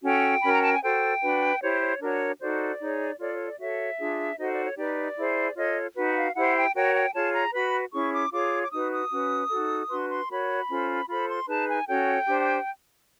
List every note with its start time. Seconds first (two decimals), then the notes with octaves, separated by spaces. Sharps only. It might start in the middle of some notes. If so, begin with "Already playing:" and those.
0.03 C#4 F#4 A4 G5
0.41 C#4 F#4 A#4 B5
0.52 A#5
0.62 A5
0.72 G#5
0.82 F#4 A4 C5 G5
1.22 D4 F#4 B4
1.61 E4 G4 C5 C#5
1.80 C#5
2.01 D4 F#4 A#4 C#5
2.39 D#4 F#4 A4 C5 D5
2.80 D#4 G#4 C#5
3.18 F4 A4 C#5 D5
3.32 C#5
3.45 D5
3.58 F#4 A4 C#5 E5
3.99 D4 F4 G#4
4.37 D#4 F#4 A4 C5 D#5
4.51 D5
4.64 C#5
4.76 D#4 G4 B4 D5
5.16 E4 G#4 C5
5.55 F4 A4 C#5 D#5
5.95 D#4 F#4 B4
6.10 F#5
6.16 F5
6.34 E4 G4 C5 F#5
6.54 G5
6.74 F#4 A#4 C#5 G5
6.94 G5
7.14 F4 G#4 C#5 A5
7.33 A#5
7.53 F#4 B4 B5
7.93 C#4 E4 G#4 C#6
8.13 D6
8.32 F4 G#4 C#5 D6
8.62 D6
8.71 D#4 F#4 B4 D#6
8.92 D#6
9.11 C#4 F#4 B4
9.50 D#4 F#4 A4
9.90 D4 F#4 B4 C6
10.09 C6
10.30 F#4 A#4 C#5 B5
10.69 C#4 F4 A4 C5
11.09 F4 A4 C5 B5
11.29 C6
11.47 D#4 G#4 B4 A5
11.68 G#5
11.87 C#4 F#4 A4 C#5 G5
12.27 D4 G4 C5